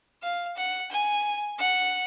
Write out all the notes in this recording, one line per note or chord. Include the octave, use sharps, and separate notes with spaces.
F5
F#5
G#5
F#5